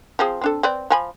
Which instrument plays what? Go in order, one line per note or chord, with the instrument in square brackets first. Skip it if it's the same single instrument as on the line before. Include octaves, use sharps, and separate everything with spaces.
[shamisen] F3 C4 G#4
C4 D4 A4
C4 B4 D5
F3 G#5 B5